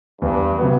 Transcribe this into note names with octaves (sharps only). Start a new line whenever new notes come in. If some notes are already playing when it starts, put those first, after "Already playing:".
E2 G2
C3 F#3 B3